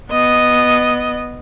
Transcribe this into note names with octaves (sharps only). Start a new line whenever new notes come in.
B3 D#5